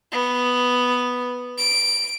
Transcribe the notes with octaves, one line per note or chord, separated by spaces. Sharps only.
B3
D7